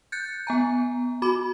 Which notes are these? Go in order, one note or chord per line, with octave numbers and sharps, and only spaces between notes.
F#6 G6 A6 C#7
B3 G#5 A#5
F#4 B5 D6